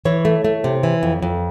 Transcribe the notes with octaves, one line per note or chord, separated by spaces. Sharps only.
E3 C#5
A3
A3
C3
E3
F2
F2